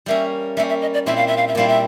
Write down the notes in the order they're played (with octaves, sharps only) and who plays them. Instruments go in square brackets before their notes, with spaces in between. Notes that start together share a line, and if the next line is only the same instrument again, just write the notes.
[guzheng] G3 A#3 C#4 [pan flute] E5
[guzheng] G3 A#3 C#4 [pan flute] E5
[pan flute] E5
D#5
D5
[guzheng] A#2 G3 C4 E4 [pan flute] E5
[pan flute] F5
E5
F5
E5
[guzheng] A#2 G3 C4 E4 [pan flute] F5
[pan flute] E5